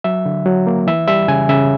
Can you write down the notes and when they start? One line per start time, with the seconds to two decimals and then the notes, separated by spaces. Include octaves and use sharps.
0.04 F#3 E5
0.26 D3
0.46 F#3
0.67 A#3
0.87 E3 E5
1.08 G3 E5
1.28 C#3 G#5
1.49 C#3 E5